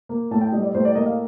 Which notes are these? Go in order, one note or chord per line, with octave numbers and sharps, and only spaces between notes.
A#3
A2 A5
G5
G3 D#5
D5
A2 C5
D5
A#3 D#5
F5